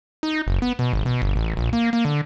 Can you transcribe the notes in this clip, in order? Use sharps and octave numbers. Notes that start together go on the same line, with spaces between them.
D#4
F#1
B3
B2
G#1
B2
G1
A1
A#1
A#3
A#3
D3